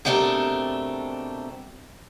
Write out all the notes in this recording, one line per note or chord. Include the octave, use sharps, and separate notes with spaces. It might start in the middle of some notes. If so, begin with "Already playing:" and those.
B2 G3 A3 C4 D4 A#4